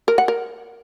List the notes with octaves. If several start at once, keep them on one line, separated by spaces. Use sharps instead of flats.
A#4
F#5
A#4